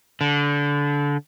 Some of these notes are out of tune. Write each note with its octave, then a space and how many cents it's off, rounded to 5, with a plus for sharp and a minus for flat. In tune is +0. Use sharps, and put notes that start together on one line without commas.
D3 -25